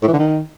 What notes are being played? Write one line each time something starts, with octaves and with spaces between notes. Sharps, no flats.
A2
E3
D3
D#3